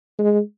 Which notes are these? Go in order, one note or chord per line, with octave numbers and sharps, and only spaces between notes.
G#3